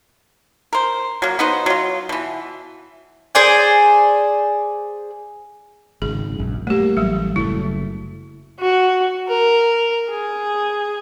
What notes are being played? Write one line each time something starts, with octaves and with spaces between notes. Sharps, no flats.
A#4 C5
F#3 A#3
B3 D#4 B4 C5
F#3 F4
B2 E3
G#4 C5 D5 G#5
G#1 C#3 G#4
A#1 F#2
G3 A3 A#3 G4
A1 F#3 G3
F#1 F#3 A3 E4
F#4
A#4
G#4